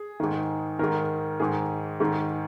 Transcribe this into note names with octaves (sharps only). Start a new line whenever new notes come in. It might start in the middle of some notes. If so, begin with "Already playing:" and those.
Already playing: G#4
G#2 D#3
G#2 D#3 A#4
G#2 D#3 G#4
G#2 D#3